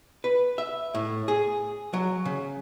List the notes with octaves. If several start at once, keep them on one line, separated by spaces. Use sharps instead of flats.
B4
E5
A2
G#4
F#3
C#3